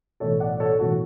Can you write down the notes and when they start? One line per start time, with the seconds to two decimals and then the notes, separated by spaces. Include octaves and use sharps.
0.20 B1 A2 E3 A4 C#5
0.40 D5 F#5
0.60 A4 C#5
0.79 B1 A2 E3 F#4 A4